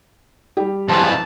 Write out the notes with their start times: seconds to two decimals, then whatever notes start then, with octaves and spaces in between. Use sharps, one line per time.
0.57 G3 G4
0.88 F2 E3 A5